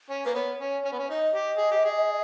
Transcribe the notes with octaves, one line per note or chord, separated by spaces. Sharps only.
C#4
A#3 B4
B3 C#5
C#4
C#4
B3
C#4
D#4 D#5
G4
G#4
G4
G#4